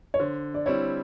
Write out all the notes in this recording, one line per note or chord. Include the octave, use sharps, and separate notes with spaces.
C#5
D3 C5
D5
G3 C4 E4 C#5